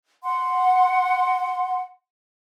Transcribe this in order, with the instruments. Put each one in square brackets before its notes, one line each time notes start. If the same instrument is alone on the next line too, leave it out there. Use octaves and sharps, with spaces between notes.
[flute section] F#5 C6